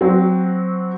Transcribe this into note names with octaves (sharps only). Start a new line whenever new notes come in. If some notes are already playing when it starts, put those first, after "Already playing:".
F#3 C4 F#4